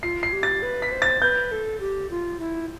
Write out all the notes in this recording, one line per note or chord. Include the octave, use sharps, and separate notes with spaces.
F4 C7
C7
G4
A6
B4
B6
C5
A6
B4 G6
A4
G4
F4
E4